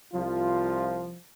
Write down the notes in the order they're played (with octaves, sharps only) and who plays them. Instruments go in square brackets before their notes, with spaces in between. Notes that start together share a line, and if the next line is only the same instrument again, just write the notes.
[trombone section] C2 F3 F4